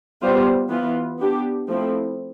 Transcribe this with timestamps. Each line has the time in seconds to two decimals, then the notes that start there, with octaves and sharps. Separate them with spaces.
0.22 G3 B3 F4 C5
0.70 E3 B3 F4
1.19 B3 D4 G4
1.68 F3 A3 C4 E4